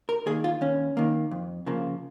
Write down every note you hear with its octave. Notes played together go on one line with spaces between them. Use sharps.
A#4
D#3 A#3 G#4
F4
D#2 C#4
D#3 A#3
F2
C#3 F3 A#3